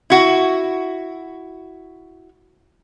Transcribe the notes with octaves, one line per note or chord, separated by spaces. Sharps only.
E4 F#4